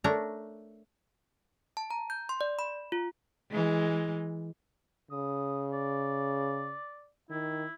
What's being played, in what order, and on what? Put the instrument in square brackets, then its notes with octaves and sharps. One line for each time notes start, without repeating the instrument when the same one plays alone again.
[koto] A3 D4 A#4 C#5 A#5
[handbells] A5
A#5
G6
C6
D5
B5
F4
[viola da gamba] E3 G#3
[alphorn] C#3 [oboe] D#6
[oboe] D5
[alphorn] D#3 [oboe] E4